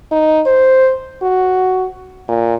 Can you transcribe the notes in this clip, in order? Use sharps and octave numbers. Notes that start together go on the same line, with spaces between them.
D#4
C5
F#4
A#2